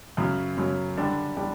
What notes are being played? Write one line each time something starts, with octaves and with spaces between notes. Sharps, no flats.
F#2 C#3 F#3 C#4
F#2 C#3 F#3 C#4
D3 G3 D4 G4
D3 G3 D4 G4